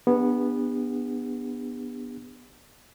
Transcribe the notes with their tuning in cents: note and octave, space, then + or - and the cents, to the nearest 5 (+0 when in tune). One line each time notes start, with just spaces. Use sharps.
B3 -10 D4 +5 G4 +40